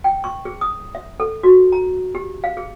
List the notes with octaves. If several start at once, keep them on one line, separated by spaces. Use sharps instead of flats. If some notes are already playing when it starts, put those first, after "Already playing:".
G5
C#6
G#4
D#6
E5
A4
F#4
A#5
G4
F5
G#4